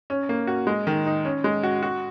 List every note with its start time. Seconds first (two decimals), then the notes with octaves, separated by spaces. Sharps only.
0.10 C#4
0.29 A#3
0.47 F#4
0.67 G#3
0.87 D#3
1.06 D#4
1.25 C#4
1.44 G#3
1.63 F#4
1.82 F#4